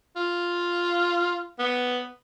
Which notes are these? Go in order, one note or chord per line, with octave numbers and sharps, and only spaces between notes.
F4
B3